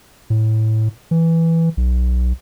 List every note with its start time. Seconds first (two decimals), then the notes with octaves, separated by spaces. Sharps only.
0.30 A2
1.11 E3
1.77 B1